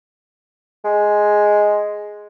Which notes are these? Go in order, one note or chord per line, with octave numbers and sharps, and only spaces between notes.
G#3